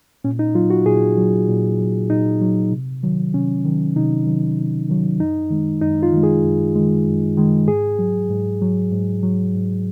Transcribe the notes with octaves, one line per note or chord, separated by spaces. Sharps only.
A#2 C#4
D#4
F#3 F4
F#4
A#2 G#4
F#3
A#2
F#3
A#2 D#4
F#3
C3
D#3 F#3
C3 C#4
D#3 F#3
C3 D#4
D#3 F#3
C3
D#3 F#3
F#2 D#4
D#3 G#3
F#2 D#4
F4
D#3 G#3
G#4
F#2
D#3 G#3
F#2
D#3 G#3
G#2 G#4
F#3
G#2
F#3
G#2
F#3
G#2